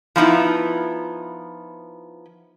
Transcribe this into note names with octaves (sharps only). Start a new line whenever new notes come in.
F3 B3 D#4 E4